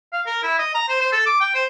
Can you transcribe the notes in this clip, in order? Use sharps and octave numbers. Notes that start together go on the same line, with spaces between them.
F5
A#4
E4
D#5
A#5
C5
C5
A4
D6
G5
C5